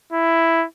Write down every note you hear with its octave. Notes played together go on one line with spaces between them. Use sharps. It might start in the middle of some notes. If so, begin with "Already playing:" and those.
E4